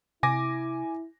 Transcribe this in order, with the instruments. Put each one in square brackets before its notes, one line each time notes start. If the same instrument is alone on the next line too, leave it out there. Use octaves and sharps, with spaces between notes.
[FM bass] C3 [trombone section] E4 [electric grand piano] G#5 D6 A#6